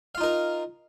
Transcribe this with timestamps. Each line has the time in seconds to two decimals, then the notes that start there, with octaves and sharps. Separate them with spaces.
0.15 F5
0.18 F4
0.21 D#4
0.24 A#4